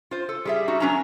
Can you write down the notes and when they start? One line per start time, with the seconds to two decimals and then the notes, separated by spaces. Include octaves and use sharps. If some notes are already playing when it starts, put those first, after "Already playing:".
0.11 F4 C5
0.29 A4
0.45 G3 G#4 E5
0.68 D#4 F#4
0.80 F#3 B3 C#4 D4 G#5 A#5